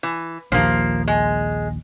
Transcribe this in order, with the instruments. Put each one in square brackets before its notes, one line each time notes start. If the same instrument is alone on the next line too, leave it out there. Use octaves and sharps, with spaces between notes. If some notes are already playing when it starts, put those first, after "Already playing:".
[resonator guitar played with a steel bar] E3
[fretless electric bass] A#1 D#2 [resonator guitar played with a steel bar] F3 A#3
[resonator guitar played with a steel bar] G#3